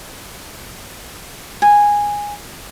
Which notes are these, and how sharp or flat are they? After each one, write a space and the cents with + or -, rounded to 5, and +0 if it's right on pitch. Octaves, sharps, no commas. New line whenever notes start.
G#5 -10